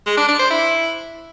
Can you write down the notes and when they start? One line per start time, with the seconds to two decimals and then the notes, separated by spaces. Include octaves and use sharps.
0.07 G#3
0.18 D4
0.29 D4
0.40 C5
0.51 E4